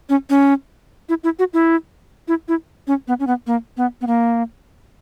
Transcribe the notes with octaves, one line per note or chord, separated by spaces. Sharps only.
C#4
C#4
E4
E4
F#4
E4
E4
E4
C#4
B3
C#4
B3
A#3
B3
B3
A#3